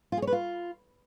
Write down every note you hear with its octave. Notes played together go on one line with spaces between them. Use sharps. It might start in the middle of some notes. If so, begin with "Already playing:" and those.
F4
G#4
C#5
B4
F4